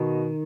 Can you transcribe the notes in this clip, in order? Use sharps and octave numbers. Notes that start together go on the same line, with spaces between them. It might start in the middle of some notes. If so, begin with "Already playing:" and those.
Already playing: B2 D#3